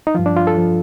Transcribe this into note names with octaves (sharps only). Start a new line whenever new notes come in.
D#4
G2 F3 F4
D4
F4
A4
F3